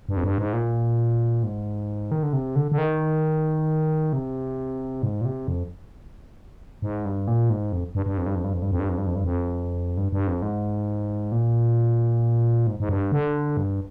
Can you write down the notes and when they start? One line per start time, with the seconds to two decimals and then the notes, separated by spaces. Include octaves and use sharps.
0.09 G2
0.17 F2
0.24 G2
0.38 G#2
0.53 A#2
1.43 G#2
2.11 D#3
2.23 D3
2.33 C3
2.56 D3
2.72 D3
2.78 D#3
4.13 C3
5.03 G#2
5.21 A#2
5.25 C3
5.48 F2
6.82 G#2
7.05 G2
7.28 A#2
7.50 G#2
7.72 F2
7.95 G2
8.06 G2
8.18 F2
8.26 G2
8.36 F2
8.44 G2
8.53 F2
8.62 G2
8.71 F2
8.80 G2
8.89 F2
8.98 G2
9.07 F2
9.15 G2
9.24 F2
9.97 G2
10.12 G2
10.27 F2
10.42 G#2
11.32 A#2
12.67 G#2
12.80 G#2
12.89 G2
13.12 D3
13.57 G2